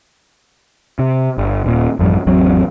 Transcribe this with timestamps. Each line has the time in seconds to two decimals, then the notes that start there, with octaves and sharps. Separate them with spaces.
0.99 C3
1.38 G1
1.64 D#1 A#2
1.99 A1 F#2 F3 G3
2.27 G#1 E2 F#3 C4